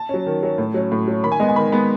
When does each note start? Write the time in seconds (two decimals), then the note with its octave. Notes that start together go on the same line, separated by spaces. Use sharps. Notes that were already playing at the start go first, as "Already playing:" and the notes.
Already playing: A5
0.09 F#3 C#4
0.26 D#3
0.43 F#3 C#4
0.58 A2
0.74 F#3 C#4
0.92 A2
1.08 F#3 C#4
1.23 D#3 B5
1.32 G#5
1.39 G#3 B3 D#5
1.49 G#5
1.56 D#3 B5
1.72 G#3 B3